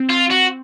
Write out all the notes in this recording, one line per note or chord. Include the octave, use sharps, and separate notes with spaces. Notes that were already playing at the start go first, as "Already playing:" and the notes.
Already playing: C4
F4
F#4